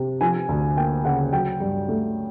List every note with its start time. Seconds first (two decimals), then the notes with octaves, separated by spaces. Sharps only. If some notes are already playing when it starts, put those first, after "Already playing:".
Already playing: C3
0.21 F3 G#5
0.49 D2
0.77 A#3 G5
1.05 C#3 F#5
1.33 F#3 G5
1.60 G2
1.89 A3